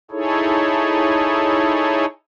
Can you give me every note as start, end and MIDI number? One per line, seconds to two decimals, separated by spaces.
0.11 2.05 63
0.11 2.05 64
0.11 2.05 68
0.11 2.05 69
0.11 2.05 73